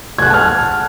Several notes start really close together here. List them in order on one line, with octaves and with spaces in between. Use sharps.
G#6 F#6 F#5 A5 F6